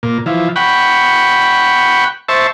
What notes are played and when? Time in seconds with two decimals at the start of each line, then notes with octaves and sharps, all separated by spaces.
0.03 A#2
0.26 E3 F3
0.56 F#5 G5 B5 C#6
2.29 C5 E5 A5 C#6